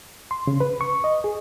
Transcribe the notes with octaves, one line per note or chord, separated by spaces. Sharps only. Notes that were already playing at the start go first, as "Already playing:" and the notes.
C6
C#3
B4
C#6
D#5
G#4